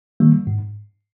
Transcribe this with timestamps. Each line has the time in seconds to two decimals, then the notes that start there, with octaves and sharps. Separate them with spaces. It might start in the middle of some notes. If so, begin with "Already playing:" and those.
0.20 D#3 G3 A#3
0.47 G#2